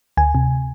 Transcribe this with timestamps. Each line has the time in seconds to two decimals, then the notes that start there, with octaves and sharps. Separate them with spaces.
0.17 D2 G#5
0.35 C3